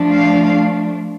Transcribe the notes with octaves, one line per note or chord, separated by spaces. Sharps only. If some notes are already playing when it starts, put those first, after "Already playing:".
Already playing: F3 A3 D4
F5